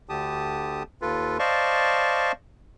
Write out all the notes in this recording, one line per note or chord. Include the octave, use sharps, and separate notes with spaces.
D2 D3 G4 A5 D#6
D#2 F4 A4 B4
C5 D5 D#5 F5 A5 C#6